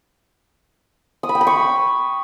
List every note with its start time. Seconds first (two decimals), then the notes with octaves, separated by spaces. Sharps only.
1.23 D#6
1.29 B5
1.35 G5
1.41 B5
1.47 C#6